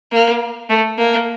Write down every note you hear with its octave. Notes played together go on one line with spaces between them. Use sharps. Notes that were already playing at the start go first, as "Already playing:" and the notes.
A#3
A3
A#3